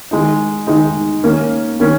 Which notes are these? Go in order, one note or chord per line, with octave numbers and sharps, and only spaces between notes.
D#3 G#3 D#4
D#3 G#3 D#4
D#3 A#3 C#4
D#3 A#3 C#4